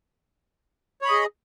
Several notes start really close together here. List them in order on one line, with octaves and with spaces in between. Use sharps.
C#5 B5 D#5 G#4